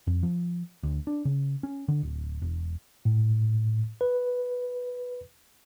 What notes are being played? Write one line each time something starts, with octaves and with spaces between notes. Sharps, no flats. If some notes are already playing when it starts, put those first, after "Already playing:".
F2
F3
D2
D4
C#3
C#4
D3
D1
E1
A2
B4